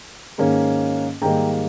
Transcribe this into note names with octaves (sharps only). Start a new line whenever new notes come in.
G#2 D#3 A#3 C#4
G#2 D#3 G3 A#3 D#4 G5 A#5